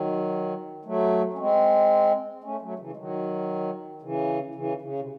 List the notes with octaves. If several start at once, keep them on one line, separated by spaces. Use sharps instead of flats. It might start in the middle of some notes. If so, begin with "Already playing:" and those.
Already playing: D#3 F#3
F#3 A3
C#4
G#3 C4
A3 C#4
F#3 A3
C#3 E3
G#3
D#3 F#3
C#3 E3
C#3 E3
C#3
C3